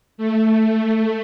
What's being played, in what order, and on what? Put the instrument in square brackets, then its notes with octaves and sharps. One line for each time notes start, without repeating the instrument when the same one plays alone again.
[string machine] A3